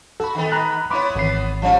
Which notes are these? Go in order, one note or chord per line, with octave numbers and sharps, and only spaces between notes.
F#4 A4 B5
D#3 B3
A#5 B5 F#6
B3 E4 C#5 B5 C6 D6
G#1 E3 B3 C7
F3 G3 C#4